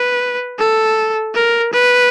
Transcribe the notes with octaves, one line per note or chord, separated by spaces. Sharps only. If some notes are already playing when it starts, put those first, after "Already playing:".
Already playing: B4
A4
A#4
B4